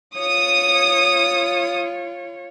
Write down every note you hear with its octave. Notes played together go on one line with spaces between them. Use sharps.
F4 C#5 D#6